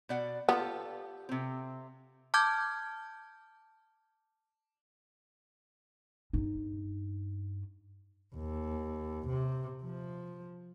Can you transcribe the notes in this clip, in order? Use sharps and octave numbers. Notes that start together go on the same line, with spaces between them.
B2 D5 F#5
B3 F4 G4 A4
C3 C4
A5 D6 F6 G6 G#6
G2 D#4
D#2
C3
F3